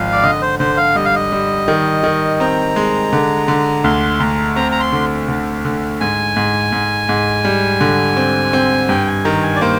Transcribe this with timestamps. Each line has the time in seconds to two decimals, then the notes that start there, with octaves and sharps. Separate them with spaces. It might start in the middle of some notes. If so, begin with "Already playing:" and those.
Already playing: G#1 F3 F5
0.12 D5
0.23 D3 D#5
0.42 C5
0.59 D3 C5
0.77 F5
0.95 G3 D#5
1.05 F5
1.15 D#5
1.32 G3
1.68 D#3
2.04 D#3
2.40 C4 A#5
2.76 G#3
3.13 D3
3.48 D3
3.84 D2 C6
4.20 D2 A#5
4.56 C4 A#5
4.72 A#5
4.80 C6
4.92 D3
5.28 D3
5.65 D3
6.00 G#2 G#5
6.36 G#2
6.72 G#2
7.09 G#2
7.45 G3
7.81 D3
8.17 C4
8.53 C4
8.89 G2 G5
9.07 G#5
9.25 D#3 A#5
9.43 G#5
9.56 D5
9.61 A#3 C5